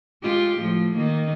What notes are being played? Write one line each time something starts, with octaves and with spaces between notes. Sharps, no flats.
G#3 F4 G4
A2 F3
D#3 A#3